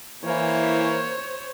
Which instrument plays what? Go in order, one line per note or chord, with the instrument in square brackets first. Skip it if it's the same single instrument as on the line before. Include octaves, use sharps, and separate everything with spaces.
[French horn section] E3 [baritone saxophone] A#3 [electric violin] C5 C#5